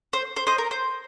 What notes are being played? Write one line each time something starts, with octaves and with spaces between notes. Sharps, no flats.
C5
C5
C5 D#5
A#4
C5